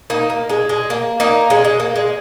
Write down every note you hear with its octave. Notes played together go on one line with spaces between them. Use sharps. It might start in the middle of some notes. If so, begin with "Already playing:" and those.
A#3 D#4
A#3
G#3
G#3
A#3
A#3 D#4
G#3 C#4
G#3
A#3
G#3